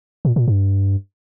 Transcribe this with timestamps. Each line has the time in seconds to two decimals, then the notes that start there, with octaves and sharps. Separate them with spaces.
0.25 A#2
0.36 A#2
0.48 G2